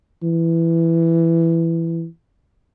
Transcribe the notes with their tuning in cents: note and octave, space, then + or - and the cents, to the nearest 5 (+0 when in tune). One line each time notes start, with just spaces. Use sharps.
E3 +10